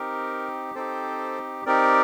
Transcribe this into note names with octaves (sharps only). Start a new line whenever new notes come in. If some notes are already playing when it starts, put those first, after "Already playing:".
Already playing: C4 D#4 G4 A#4
C4 D#4 G4 A4 C5
C4 D#4 G4 A#4 D5